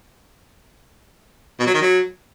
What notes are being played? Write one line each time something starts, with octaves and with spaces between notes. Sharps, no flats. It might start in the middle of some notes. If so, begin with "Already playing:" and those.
B2
F#3
D#3
F#3